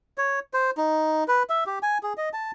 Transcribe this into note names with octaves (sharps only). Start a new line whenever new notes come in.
C#5
C5
D#4
B4
E5
G4
G#5
G#4
D#5
A5